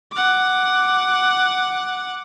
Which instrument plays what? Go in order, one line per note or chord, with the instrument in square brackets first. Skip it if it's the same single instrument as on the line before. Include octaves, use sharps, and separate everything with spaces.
[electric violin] F#5 D6